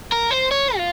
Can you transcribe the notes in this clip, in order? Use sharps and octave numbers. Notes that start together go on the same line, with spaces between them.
A#4
C5
C#5
F4